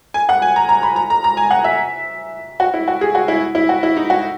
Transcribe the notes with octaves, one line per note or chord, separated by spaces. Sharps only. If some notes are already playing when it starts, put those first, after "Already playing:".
G#5
F#5
G#5
A#5
A#5
B5
A#5
A#5
A#5
G#5
F#5
E5
F#4
E4
F#4
G#4
F#4
E4
E4
F#4
E4
D#4
F#4